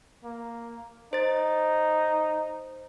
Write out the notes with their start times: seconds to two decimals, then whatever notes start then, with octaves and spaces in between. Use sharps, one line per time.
0.24 A#3
1.13 D#4 C5 A6